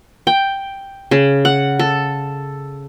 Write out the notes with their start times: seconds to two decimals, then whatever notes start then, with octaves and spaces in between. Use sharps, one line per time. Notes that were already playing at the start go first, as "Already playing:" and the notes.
0.27 G5
1.11 C#3
1.45 F#5
1.79 A4